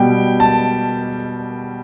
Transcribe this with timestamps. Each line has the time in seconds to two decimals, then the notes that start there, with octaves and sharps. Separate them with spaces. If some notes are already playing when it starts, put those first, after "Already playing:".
Already playing: B2 G3 G5
0.40 A5